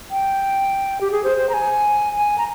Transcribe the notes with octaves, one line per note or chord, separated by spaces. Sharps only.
G5
G4
G#4
C5
C5
A#5
G#5
G#5
A#5